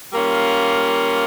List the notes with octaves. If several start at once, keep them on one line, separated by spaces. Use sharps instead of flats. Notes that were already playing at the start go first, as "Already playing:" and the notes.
G3 A#3 C#4 F4